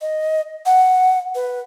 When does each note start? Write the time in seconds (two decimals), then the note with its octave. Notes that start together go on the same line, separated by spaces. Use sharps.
0.01 D#5
0.66 F#5
1.35 B4